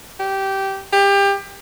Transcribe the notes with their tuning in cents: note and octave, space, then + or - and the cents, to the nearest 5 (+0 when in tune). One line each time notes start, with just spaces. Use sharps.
G4 -15
G4 +25